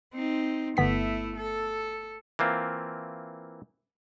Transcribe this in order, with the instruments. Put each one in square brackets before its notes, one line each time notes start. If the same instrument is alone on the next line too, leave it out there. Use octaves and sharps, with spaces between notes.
[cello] C4 D#4
[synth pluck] G1 B3 B6 [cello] A3 E4
[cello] A4
[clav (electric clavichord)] E3 A#3 C4 F4